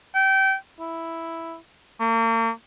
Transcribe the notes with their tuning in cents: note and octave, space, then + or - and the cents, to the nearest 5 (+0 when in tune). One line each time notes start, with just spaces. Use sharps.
G5 -25
E4 +0
A#3 -40